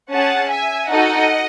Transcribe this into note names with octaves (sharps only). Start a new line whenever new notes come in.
C#4 G#4 F#5 A5
E5 G#5
D#4 F#4 A4 D#5 F#5